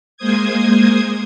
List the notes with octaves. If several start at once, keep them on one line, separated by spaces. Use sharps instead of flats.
G#3 A#3 C5 D#6 G#6